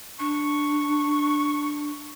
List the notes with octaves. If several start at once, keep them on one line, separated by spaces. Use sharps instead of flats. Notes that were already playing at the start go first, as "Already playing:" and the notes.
D4 C#6